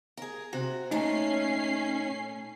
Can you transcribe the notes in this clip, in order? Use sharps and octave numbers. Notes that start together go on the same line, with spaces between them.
G#4 A#4
C3 F#4
A#2 A3 C#4 D#4 C7